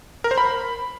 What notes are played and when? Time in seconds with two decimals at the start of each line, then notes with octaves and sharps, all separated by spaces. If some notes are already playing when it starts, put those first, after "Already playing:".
0.24 A#4
0.31 C5
0.38 B5